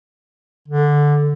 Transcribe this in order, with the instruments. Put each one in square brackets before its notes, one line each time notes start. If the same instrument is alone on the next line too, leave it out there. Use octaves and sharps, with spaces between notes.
[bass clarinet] D3